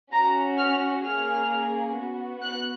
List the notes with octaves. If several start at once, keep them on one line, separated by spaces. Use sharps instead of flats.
C#4 F#4 A#5
F6
A#3 C#4 G#4 F6
B3 F#4
F#6